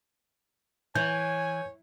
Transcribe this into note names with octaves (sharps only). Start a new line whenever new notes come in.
E3 C#5 G#5 G6